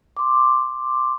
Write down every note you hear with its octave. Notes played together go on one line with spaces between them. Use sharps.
C6 D6